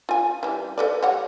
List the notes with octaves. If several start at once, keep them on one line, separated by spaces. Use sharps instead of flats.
F4 G#5
E3 G3
A4 B4 D5
G3 C#5 F#5